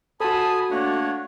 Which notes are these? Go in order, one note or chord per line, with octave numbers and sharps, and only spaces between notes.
F#4 A4 C5 G#5 A5 B5 D#6
A3 A#3 D4 C#5 F#5